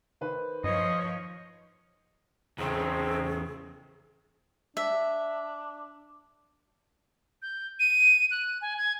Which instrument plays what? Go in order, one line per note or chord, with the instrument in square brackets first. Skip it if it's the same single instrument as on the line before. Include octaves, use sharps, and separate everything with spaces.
[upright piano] D#3 B4 C5
[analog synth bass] G2 [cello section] F3 C#5 [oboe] D#5
[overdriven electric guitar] E2 C#3 [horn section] G#2 A3 C4 [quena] G#4
[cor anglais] D4 [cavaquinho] E5
[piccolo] G6
D#7
F#6
G#5
G#6